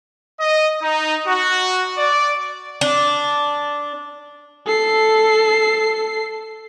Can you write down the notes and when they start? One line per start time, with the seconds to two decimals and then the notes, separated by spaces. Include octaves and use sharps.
0.39 D#5
0.82 D#4
1.27 F#4
1.97 D5
2.81 D4
4.66 A4 C7